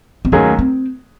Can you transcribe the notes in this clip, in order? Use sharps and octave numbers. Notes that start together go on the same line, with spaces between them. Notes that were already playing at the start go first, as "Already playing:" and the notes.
C4
D#2 D#3 F#3 A3 C#4 G#4
C4